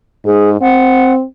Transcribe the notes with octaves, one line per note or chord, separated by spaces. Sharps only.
G#2 G#4
C4 F#5